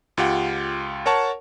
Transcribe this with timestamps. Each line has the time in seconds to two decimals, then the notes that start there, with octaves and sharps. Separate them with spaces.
0.17 C#2 F4 G4 F#5 G5
1.06 A#4 C#5 F#5 A5 C#6